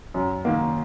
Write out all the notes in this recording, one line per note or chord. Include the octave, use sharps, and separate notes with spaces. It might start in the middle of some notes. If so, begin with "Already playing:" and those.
F#2
D#3 A#3